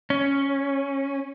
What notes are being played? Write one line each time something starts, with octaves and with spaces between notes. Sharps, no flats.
C#4